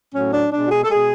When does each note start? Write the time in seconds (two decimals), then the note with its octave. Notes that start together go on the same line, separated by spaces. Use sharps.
0.14 A2 F#3 A3 C#4
0.33 D4
0.52 B2 G#3 D4
0.66 F#4
0.72 G#4
0.85 A4
0.90 B2 G#3 G#4